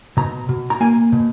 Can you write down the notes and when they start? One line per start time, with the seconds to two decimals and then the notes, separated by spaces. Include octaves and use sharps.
0.17 B2 A#5
0.49 B2
0.70 A#5
0.81 A#3 G#5
1.12 B2